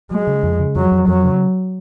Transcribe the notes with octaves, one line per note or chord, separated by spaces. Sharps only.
F#3 G#3
C#3
F2
C#3
F2 F#3
F2
F2 F#3
C#3